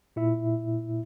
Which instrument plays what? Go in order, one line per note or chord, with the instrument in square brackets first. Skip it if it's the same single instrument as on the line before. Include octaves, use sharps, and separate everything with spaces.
[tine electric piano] A#2 E4 E5